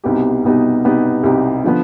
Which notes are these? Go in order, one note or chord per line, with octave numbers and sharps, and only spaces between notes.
C2 B2 B3 D#4 G4
C2 B2 B3 D#4 G4
C2 B2 B3 D#4 G4
C2 B2 B3 D#4 G4
D3 F3 B3